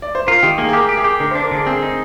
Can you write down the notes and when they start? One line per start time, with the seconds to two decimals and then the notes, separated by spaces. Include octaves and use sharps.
0.02 D5
0.15 C5
0.27 F4 A#4
0.43 D#3 G4
0.58 A#3 G#4
0.69 G#4
0.73 G4 A#4
0.89 G4
0.97 G#4
1.04 G4
1.20 D3 A#4
1.31 C5
1.35 D4
1.44 A#4
1.51 D3 G#4
1.66 C4 G#4
1.83 D#4